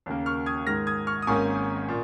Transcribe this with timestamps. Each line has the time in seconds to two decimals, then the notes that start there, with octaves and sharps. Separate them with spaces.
0.06 D#2 C#3 A#3
0.26 C#6 F6
0.46 D#6 G#6
0.67 G#2 D#3 G#3 F6 A#6
0.87 D#6 G#6
1.07 C#6 F6
1.22 D#6
1.27 G#1 G#2 D#3 A#3 C#4 G#5 C#6
1.88 A#2